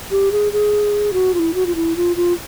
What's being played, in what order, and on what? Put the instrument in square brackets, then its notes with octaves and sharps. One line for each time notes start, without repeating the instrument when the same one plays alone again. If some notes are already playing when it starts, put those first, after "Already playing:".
[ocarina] G4
G#4
G#4
F#4
F4
E4
F#4
F4
E4
F4
F4